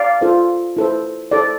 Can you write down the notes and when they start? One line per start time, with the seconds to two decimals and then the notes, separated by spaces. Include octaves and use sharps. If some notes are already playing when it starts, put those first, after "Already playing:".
Already playing: D5 F5
0.21 F4 A4 C5
0.77 E4 A4 C5
1.31 E4 A4 C5 D5